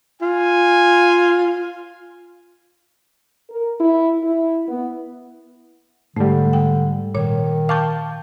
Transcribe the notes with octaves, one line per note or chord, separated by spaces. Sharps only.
F4 G#5
A#4
E4
E4
B3
G#2 D3 G3 A3
G5
A#2 D#3 C#5
F5 G5 A5 C#6 D6 G6